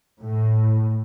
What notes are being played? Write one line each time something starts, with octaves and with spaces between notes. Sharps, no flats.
A2